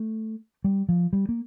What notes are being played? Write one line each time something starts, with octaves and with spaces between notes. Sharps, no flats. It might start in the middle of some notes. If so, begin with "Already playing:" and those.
Already playing: A3
G3
F3
G3
A#3